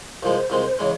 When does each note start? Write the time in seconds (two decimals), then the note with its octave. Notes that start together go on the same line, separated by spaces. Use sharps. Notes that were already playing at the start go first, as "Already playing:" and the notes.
0.22 C2 A#2 F3 G#3 C5
0.50 C2 A#2 G#3 C4
0.79 C#3 E3 G#3 C#5